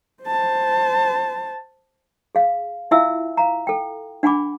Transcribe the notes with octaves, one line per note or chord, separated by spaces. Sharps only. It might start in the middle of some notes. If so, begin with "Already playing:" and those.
C5 A5
G#4 F5
E4 F4 E5 F5 G#5 E6
F5 A#5
A4 G5
D4 F#5 G#5 B5 D6